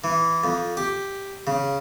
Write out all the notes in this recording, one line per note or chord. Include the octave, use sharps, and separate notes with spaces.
E3
F2
G4
C#3